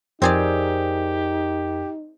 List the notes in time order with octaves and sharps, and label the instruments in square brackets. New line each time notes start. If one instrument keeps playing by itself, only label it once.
[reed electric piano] F2 A#4 [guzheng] C4 G#4 D5 [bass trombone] D#4 [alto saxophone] G4